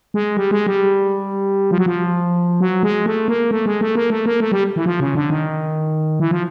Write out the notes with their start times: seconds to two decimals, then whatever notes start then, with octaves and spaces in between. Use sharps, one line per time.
0.14 G#3
0.37 G3
0.51 G#3
0.67 G3
1.71 F3
1.78 F#3
1.86 F3
2.61 F#3
2.83 G#3
3.06 A3
3.28 A#3
3.51 A3
3.66 G#3
3.81 A3
3.95 A#3
4.10 A3
4.26 A#3
4.40 A3
4.52 G3
4.76 E3
4.86 F3
5.00 C#3
5.15 D3
5.30 D#3
6.20 E3
6.31 F3